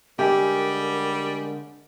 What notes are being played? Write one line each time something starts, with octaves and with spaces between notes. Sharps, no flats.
D3 G3 G#3 C#4 G4 A#4